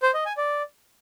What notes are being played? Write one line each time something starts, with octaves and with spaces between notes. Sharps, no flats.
C5
D#5
G#5
D5